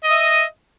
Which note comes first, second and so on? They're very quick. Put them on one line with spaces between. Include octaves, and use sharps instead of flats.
D#5 D#6 E5